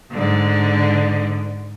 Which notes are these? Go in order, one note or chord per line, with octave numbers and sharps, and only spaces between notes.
G#2 D3